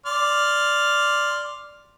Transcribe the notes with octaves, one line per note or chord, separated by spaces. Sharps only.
D5 C6 F6